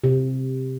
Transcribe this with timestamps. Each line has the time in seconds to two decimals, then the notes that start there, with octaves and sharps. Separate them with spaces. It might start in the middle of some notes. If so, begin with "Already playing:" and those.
0.04 C3